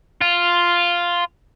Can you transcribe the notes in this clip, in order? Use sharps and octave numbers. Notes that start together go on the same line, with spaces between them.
F4